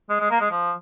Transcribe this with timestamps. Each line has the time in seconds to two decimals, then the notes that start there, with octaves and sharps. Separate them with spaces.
0.10 G#3
0.20 G#3
0.31 A#3
0.41 G#3
0.51 F3